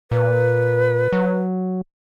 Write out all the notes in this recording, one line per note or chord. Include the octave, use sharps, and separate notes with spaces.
A#2 B4
F#3